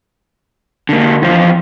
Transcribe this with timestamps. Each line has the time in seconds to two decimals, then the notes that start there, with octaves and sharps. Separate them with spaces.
0.89 D3 A#3
1.22 E2 F3 C5 F5